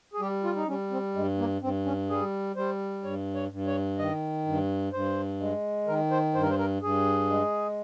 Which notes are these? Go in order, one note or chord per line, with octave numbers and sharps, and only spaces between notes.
G#4
G3 G4
F4
D#4
G3 C#4
C4
G2 G#3
A#3
G2 C4
C#4
G3 G#4
G3 C5
G2 C#5
C#5
G2
C#5
D#3 D#5
G2
G2 C5
G#3
D#3 A#4
C5
G2 C5
A#4
C5
A#4
G2 G#4
G#3